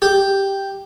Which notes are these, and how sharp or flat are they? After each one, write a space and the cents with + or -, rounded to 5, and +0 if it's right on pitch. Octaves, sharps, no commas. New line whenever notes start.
G4 +0